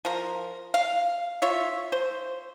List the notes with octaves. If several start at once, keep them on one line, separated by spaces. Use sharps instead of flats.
F3 A#4
F5
F4 C#5 E5
C5